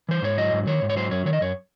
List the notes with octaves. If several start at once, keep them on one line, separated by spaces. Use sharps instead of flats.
E3 C5
G#2 C#5
F#3 D#5
G#2
D#3 C#5
G#2
C#5
F#3 C5
F#2 C#5
D#3 C#5
D#5
F#2 C#5